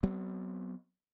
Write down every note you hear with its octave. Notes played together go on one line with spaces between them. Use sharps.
F#3 B3 C4